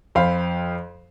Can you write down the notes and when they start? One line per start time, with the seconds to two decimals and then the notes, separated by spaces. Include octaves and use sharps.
0.15 F2 C5 F5 B5